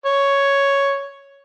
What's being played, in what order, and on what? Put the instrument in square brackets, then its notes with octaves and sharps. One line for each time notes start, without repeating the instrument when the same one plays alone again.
[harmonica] C#5